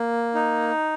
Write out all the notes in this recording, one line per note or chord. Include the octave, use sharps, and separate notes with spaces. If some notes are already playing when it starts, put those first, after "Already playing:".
Already playing: A#3
D#4